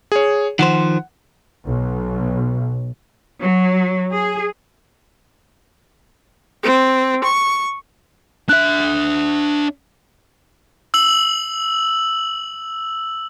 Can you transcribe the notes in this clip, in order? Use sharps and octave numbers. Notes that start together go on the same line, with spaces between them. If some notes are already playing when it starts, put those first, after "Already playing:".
G#4 C#5
D#3 F3 C5 F#5
B1
F#3
G#4
C4
C#6
D4 E5 F#6
E6 F#7